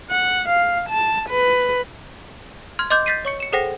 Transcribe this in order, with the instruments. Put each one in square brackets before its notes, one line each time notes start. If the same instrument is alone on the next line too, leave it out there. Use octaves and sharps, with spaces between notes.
[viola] F#5
F5
A5
B4
[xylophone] C6 F6 G#6
D#5 C6 D6 G6
G6 A6 B6 C7 D#7
C#5 C#6 C#7
C#7 E7
G#4 A4 C5 F#5 G5 A#6